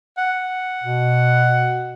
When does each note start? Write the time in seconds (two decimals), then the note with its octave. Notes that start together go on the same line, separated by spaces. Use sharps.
0.18 F#5
0.84 B2